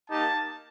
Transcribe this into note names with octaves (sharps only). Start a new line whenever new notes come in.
A#3 D#4 G4 A5